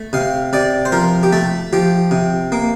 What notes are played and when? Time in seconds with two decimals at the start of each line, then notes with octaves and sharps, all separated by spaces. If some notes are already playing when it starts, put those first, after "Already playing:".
Already playing: A3
0.13 C3 F5
0.53 C3 D5
0.85 C5
0.92 F3 A#4
1.23 G4
1.33 A3 A4
1.73 F3 G4
2.11 C3
2.52 A#3